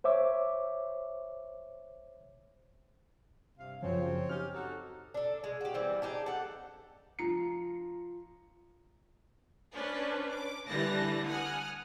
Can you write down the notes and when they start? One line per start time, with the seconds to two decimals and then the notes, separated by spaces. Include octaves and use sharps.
0.04 C5 C#5 E5 D6
3.58 G2 C3 F5
3.82 F#2 C#3 F3 C4 C#5
4.29 C#4 D#4 G4 F6
4.53 D#4 F#4 A4
5.14 D4 A4
5.44 G#3
5.61 F#4 G4
5.74 E3 G3 B3 C4
6.02 D4 D#4 G4 G#4
6.26 A4 F#5
7.19 F3 A#5 C#7
9.73 C#4 D4 B4 C5
10.31 D6
10.68 D3 E3 G3 B4 A5 A#6
11.24 F#5 G#5 D#6 F6 F#6